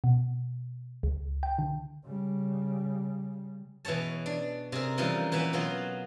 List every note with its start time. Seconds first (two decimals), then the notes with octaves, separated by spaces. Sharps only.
0.04 B2
1.03 C#2
1.43 G5
1.59 D3
2.04 C#3 G3
3.85 B2 E3 G#4 C#5 A5
4.26 D4
4.72 C3 G#4 A#4
4.98 C#3 E3 F3 G3 D#4 A#4
5.32 A#2 E3 E5 F#5 G#5 B5
5.53 B2 F#3 F4 D#5 F5